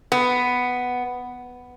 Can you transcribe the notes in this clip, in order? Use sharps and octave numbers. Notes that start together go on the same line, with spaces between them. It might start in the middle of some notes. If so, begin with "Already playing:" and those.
B3